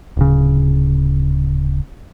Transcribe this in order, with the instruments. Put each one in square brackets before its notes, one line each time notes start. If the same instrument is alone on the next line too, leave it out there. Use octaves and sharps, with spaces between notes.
[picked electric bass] D1 C#3